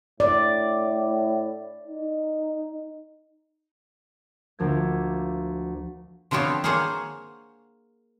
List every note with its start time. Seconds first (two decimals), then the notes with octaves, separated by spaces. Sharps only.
0.20 A2 D5
1.88 D#4
4.59 D2 F3 A#3 D6 G#6
6.31 D3 F3 B3 C4 C#5 A5
6.64 A#3 G#4 C5 C#5 F#5